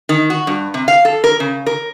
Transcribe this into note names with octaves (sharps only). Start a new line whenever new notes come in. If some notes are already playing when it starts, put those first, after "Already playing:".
D#3
F#4
G2
C3
F5
A4
A#4
C#3
A#4